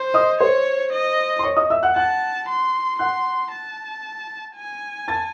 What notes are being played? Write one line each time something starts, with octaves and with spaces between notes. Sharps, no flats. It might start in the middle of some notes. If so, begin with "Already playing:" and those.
Already playing: C5
D#5 D#6
C5 C#5 C6
D#5
C6
C#5 C#6
D#5 D#6
E5 E6
F#5 F#6
F#5 A5 F#6
C6
F#5 C6 F#6
A5
G#5
A5 A6